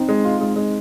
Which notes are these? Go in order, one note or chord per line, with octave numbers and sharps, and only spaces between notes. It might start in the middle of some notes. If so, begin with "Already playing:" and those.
Already playing: C4 D#4
G#3
F4
G#3
G#3